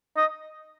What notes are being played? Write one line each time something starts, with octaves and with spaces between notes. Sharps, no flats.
D#5